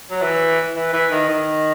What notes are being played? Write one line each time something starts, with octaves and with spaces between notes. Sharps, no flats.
F#3
E3
E3
E3
D#3
D#3